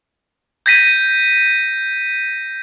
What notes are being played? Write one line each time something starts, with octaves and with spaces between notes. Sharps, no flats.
G6 G#6 A#6 B6 D#7